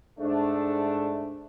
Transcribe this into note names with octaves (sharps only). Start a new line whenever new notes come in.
G#2 A3 D4